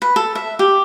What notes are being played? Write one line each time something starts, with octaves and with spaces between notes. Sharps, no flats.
B4
A4
E5
G4